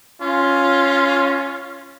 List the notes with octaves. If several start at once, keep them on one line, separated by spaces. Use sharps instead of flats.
C#4 F4